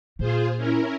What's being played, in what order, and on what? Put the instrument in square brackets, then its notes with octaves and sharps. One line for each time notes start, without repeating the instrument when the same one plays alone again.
[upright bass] A#2 A#3 [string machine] F4 G#4 C5
[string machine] C#4 E4 A#4